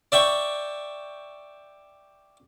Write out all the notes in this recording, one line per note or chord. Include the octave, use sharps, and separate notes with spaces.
D5 E5 G5 C#6